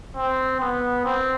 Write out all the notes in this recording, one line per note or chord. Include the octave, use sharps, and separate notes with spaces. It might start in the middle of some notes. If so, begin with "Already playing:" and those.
C4
B3
C4